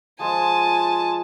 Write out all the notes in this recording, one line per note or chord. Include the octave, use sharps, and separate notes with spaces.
F3 G#3 C5 G#5 A5